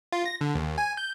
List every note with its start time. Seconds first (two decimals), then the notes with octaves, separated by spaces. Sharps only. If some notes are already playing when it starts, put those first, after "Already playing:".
0.12 F4
0.26 A#6
0.41 D3
0.55 D#2
0.78 G#5
0.97 G6